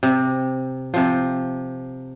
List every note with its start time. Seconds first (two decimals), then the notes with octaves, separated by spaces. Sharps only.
0.03 C3
0.94 C3 F3